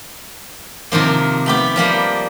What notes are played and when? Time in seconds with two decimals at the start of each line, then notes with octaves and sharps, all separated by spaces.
0.92 C3 D#3 F3 A#3
1.46 A3 B3 G4
1.76 F3 G3 A#3